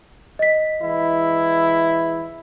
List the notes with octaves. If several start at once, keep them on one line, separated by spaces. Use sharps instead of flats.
D#5 B6
E3 G#3 E4